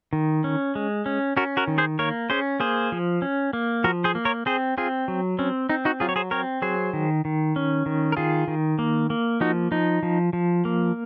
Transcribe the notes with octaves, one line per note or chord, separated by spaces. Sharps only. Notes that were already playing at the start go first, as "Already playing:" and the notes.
D#3
C#4
G#3
C#4
C#4 F#4 A#4
F#4 A#4
D#3
G#4 C5
A#3 A#4 C#5
C#4 G#4 C5
A#3 G#4 C5
F3
C#4
A#3
F3 F#4 A#4
G#4 C5
A#3
A#4 C#5
C4 G#4 C5
C4 F4 G#4
F#3
C4 C#4
C4 D#4
D#4 F#4
F#3 F4 G#4
C#5
G#4 C5
C4 A#4 C#5
F#3 G#4 C5
D#3
D#3
C#4
D#3
A#4
D#3 F4 G#4
D#3
A#3
A#3
F3 D#4 F#4
F3 D#4
F3
F3
A#3